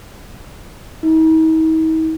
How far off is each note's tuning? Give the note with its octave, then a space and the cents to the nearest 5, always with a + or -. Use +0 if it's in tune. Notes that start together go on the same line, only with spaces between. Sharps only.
D#4 +45